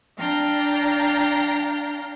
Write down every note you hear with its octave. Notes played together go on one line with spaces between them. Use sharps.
D4 F5 G5 A#5